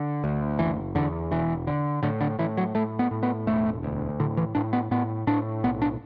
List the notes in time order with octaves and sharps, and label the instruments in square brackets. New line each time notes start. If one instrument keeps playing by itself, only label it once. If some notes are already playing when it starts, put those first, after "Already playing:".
Already playing: [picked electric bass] D3
D2
F#1 E3
E2 D3
E1 E3
D3
A2 D3
D3
A2 E3
F#3
A2 A3
B3
A2
B3
E1 A3
D2
A2 D3
E3
A2 D4
B3
A2 B3
A2 D4
B1 B3
D4